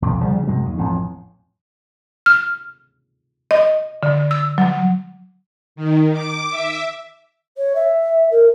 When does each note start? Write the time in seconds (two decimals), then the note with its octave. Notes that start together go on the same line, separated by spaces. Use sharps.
0.02 B1 F2 A2
0.20 C2 C#3 F3 G3
0.35 C#3
0.47 F#2 C3 F#3 G#3
0.66 D#2
0.78 A1 F2 A2
2.26 F6
3.51 D#5
4.03 D3
4.31 E6
4.58 F#3
5.76 D#3
6.13 D6
6.50 E5
7.57 C#5
7.75 E5
8.31 A#4